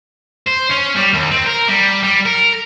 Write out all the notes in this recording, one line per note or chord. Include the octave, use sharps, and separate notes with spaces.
C5
C#4
G3
D#2
C4
A#4
G3
G3
A#4